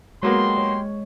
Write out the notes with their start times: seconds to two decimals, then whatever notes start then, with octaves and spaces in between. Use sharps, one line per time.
0.23 F#3 G#3 A#3 B3 G4 G5 C6
0.58 C#5